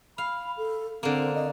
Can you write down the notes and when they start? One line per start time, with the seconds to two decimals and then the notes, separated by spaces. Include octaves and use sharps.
0.18 F5 B5
0.57 A4
1.03 D3 A#3 C4
1.35 D#5